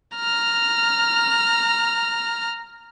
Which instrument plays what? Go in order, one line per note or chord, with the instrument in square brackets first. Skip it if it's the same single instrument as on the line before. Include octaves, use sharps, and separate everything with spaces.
[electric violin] A#5 F6